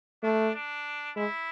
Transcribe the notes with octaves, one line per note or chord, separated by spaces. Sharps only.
A3 D4
D4
G#3 E4